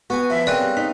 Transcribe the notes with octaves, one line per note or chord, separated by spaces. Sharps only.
B3 F#4 G#5
F3 E5
C#3 C4 A#4 D5 G#5 F#6
G3
D#4 B6